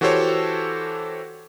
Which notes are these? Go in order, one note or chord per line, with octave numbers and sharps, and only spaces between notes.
E3 F#4 G4 A4 C5 C#5